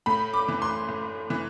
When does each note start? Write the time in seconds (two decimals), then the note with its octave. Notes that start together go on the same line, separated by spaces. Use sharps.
0.06 A2 B5
0.34 D6
0.48 E3
0.62 C6
0.89 A2
1.30 E3